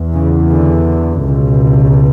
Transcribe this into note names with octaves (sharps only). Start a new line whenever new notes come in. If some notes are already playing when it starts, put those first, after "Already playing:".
Already playing: E2
C#3
D3
C#2 B2